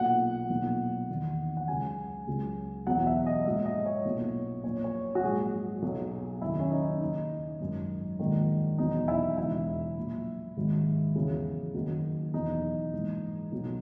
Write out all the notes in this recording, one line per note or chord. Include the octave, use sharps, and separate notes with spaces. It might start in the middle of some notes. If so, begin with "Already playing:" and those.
Already playing: B1 A#2 F#3 F#5
B1 A#2 F#3
E2 D#3 F#3
F#5
C#2 C#3 F#3 G#5
C#2 C#3 F#3
E2 B2 F#3 F#5
E5
D#5
A#1 G#2 F#3 E5
D#5
C#5
B1 A#2 F#3
A#1 A#2 F#3 C#5
C#5
F#4
A#1 G#2 F#3 G#4
B1 B2 F#3
F#1 F#2 D#3 E4
C#4
D#4
D#2 C#3 F#3 D#4
G#1 F#2 D#3
A#1 G#2 D#3
E2 B2 F#3 D#4
E4
E1 E2 C#3 F#3 E4
A#1 A#2 F#3
G#1 G#2 D#3 F#3
E2 C#3 F#3
F#1 F#2 D#3 F#3
E2 B2 F#3 D#4
A#1 G#2 E3
B1 B2 F#3